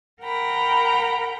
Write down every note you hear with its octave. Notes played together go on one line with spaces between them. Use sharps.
A#4 F#5 G5 A#5 B5